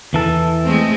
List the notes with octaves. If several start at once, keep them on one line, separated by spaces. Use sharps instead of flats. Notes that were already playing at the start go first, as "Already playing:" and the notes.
E2 E3 A4
G#3 A3 C4